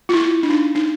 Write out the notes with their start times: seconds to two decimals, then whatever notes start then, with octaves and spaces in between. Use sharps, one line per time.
0.09 F4
0.14 E4
0.43 D4
0.50 D#4
0.75 D#4